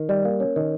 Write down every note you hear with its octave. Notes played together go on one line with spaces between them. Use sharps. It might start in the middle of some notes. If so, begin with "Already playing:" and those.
Already playing: D#3
G3
A#3
C#4
D#3